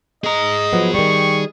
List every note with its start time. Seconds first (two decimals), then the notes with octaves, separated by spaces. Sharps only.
0.24 G#4 D#5 A#5
0.73 F3 F#3 B3
0.95 D#3 G3 C#6